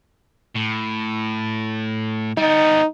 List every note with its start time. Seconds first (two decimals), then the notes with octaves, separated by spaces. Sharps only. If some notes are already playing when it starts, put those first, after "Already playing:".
0.55 A2
2.38 G3 B3 D#4